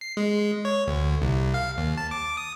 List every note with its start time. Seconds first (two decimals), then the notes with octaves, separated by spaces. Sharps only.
0.01 C7
0.17 G#3
0.65 C#5
0.87 D2
1.22 C2
1.54 F5
1.78 D#2
1.98 A5
2.11 D6
2.37 D#6